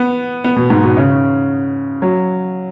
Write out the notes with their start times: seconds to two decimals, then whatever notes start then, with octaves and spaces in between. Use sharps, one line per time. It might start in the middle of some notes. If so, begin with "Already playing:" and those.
Already playing: B3
0.44 B3
0.56 B2
0.70 G#2
0.83 B2
0.97 C#3
2.02 F#3